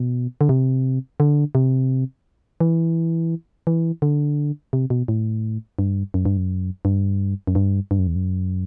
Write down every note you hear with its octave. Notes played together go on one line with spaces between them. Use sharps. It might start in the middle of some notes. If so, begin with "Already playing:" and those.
Already playing: B2
D3
C3
D3
C3
E3
E3
D3
C3
B2
A2
G2
F#2
G2
F#2
G2
F#2
G2
G2
F#2
E2
F#2